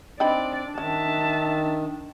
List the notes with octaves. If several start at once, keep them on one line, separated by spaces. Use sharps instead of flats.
C4 D4 D#4 D5 G5 B5
D#3 C#4 E5 A5